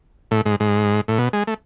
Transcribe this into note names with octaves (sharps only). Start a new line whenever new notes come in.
A2
G#2
G#2
A2
B2
G#3
A3